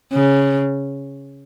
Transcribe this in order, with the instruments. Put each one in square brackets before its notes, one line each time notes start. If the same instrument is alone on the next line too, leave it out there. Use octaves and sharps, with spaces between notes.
[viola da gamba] C#3